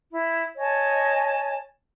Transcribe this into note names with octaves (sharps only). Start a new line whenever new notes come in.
E4
C#5 D#5 G#5 A5